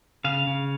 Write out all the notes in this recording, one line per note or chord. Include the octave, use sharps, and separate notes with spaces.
C#3 F5
C#3